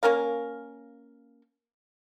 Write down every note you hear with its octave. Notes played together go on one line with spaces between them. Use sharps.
A#3 C#4 A#4 F5